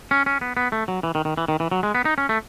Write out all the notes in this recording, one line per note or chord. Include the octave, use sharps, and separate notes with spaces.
C#4
C#4
B3
B3
A3
F#3
E3
D#3
D#3
E3
D#3
E3
F#3
G#3
B3
D#4
C#4
A3